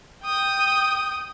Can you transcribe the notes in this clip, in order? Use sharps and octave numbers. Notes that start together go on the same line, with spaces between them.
G5 D#6